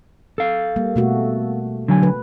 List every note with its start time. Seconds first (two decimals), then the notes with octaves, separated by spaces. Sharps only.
0.38 A4 F5
0.76 G3 A#3
0.96 B2 A3 F#4
1.88 D3 F#3 G#5
2.03 B4